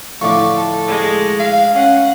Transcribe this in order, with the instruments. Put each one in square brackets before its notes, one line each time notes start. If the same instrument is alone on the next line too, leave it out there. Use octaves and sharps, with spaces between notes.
[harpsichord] A2 D3 F3 [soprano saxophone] A3 [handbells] C#6 D6
[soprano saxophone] A4
[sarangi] G#3
[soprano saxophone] F5
[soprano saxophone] C#4 [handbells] F5 [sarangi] F#5